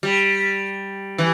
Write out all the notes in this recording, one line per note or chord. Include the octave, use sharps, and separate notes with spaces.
G3
E3